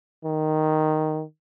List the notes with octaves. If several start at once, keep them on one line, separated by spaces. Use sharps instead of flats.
D#3